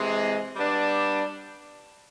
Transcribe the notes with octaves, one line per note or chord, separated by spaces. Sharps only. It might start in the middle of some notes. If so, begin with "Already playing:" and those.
Already playing: C3 E3 G#3
G3 B3 D4